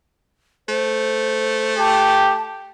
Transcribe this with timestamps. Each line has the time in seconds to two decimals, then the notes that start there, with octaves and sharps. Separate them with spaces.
0.69 A3 C5
1.78 G4 A5